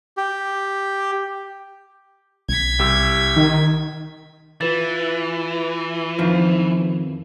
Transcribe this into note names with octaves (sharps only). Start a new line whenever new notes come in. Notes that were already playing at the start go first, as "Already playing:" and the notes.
G4
B1 G#6 B6
C2 G4 E6
D#3
E3 F4 B4 A6
F2 D#3 F3